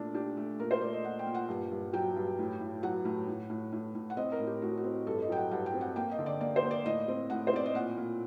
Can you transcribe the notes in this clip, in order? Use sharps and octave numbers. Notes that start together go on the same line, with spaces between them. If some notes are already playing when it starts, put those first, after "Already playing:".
Already playing: A#2 A3 D4
D4 G4
A3
A#2 A#4
C5
A3 D5
D#5
A#2 F#5
G5
A#2
F#5
G2
G2
F#3 G5
G2
A2
A2
F#3 F#5
A2
A2
A2
A2
A2
F#5
C4 D#5
A#4
A2
G4
A2 F#4
F#4
C4
G2 A4
D#5
F#3 G5
F#5
G2 F#5
G5
C4
F#5
A#3 G5
D#5
D3
D5
A#3 D5
C5
A#3
D5
A2 D#5
C4
A2 F#5
C5
C4 D5
D#5
A#2 F#5
A#2